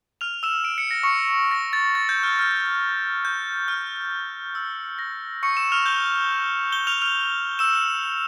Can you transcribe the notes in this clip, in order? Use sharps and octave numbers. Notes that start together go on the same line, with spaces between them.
F6 F7
E6 E7
D7
C#7
A#6
C#6 C#7
A#6
A6
A6
G6
F6
F6
G6
F6
E6
A#6
C#6 C#7
E6 E7
F6 F7
G6 G7
G6 G7
F6 F7
F6 F7
E6 E7